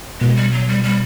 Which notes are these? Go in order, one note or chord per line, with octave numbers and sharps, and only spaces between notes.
B2 G#3
G3
F#3
G3
G3